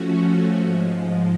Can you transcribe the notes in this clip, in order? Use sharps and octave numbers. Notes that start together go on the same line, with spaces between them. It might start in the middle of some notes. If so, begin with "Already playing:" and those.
Already playing: F3 A3 C#4 F#4
G#2 F3 G#3